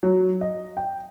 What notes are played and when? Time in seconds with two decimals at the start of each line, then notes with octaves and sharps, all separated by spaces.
0.03 F#3
0.41 D#5
0.77 G5